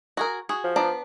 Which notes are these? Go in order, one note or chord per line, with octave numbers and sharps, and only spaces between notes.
F#4 G#4 A#4
F#4 G#4
F3
B3 D4 A#5